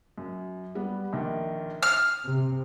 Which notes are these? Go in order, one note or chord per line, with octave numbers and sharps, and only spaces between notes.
F#2
G3 B3
A#1 D#3
D#6 F6 C7
C3